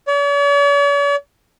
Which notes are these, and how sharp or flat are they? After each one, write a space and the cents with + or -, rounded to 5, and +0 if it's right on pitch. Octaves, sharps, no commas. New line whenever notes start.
C#5 +45